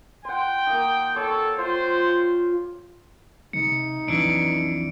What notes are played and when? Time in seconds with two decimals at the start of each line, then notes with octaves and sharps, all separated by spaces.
0.25 F#5 G5 C6
0.67 A#3 D#4
1.16 A4 C#5 G5 D6
1.58 F4 C5
3.53 C3 D#4 C#7
4.08 B1 F2 E3 D4 D7